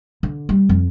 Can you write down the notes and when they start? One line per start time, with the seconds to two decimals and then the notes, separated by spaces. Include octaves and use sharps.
0.23 D3
0.49 G3
0.69 F2